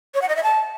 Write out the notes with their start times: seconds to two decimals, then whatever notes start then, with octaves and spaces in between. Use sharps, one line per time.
0.14 C#5
0.22 F#5
0.29 D#5
0.36 E5
0.43 A5